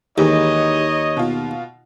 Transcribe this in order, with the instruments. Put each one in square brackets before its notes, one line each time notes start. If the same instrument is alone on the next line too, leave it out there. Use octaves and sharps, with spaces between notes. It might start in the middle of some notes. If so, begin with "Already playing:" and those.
[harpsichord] D#2 [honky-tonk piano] E3 G#3 G4 [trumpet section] D#4 C#5 D#5
[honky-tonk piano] B2 F4